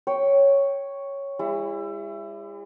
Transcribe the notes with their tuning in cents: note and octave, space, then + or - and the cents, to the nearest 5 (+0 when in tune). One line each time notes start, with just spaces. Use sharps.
C#5 +0 G5 +0
G#3 -45 E4 +25